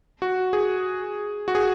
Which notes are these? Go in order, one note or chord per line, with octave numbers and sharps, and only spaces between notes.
F#4
G#4
F#4
G#4